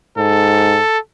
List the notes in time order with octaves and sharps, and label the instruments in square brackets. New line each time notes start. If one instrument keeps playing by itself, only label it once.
[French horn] G#2 [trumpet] A4